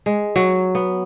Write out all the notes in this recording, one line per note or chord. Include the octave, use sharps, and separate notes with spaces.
G#3
F#3
B3